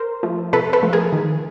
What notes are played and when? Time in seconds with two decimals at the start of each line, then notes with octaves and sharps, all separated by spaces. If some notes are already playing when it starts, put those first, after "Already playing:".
Already playing: A#4 C5
0.23 F3 A3
0.53 C3 A4 B4
0.73 A4 B4
0.83 F3 A3
0.93 G#4 A#4
1.13 D#3